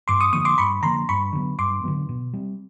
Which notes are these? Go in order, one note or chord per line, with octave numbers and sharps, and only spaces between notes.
G2 C6 D6
C#6 D#6
D3 F3 A#3 C#6 D#6
C6 D6
G2 B5 C#6
D3 F3 A#3 A#5 C6
G2 B5 C#6
D3 F#3 B3
G2 C6 D6
D3 F#3 B3
B2
G3 C4